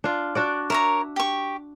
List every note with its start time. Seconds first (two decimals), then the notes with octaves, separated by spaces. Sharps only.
0.04 D4 F4
0.35 D4 F#4 D5
0.70 A#4 C#5 E5 A#5
1.16 G4 C#6